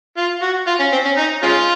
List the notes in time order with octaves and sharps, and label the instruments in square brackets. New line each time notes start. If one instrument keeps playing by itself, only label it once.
[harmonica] F4
F#4
F4
C#4
C4
C#4
D#4
G#3 C#4 F4